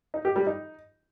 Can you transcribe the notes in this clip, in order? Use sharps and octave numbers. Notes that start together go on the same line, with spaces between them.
D#4
G4
G3
D#4